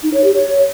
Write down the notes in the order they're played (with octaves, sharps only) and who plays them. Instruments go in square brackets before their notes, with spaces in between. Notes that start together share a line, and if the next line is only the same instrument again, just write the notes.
[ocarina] D#4
C#5
G4
C#5